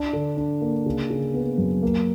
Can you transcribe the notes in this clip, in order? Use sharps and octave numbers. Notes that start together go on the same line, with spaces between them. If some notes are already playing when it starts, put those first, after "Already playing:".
Already playing: D4
D3
D4
A#3
C#3
C#3
B3
F#2
A#3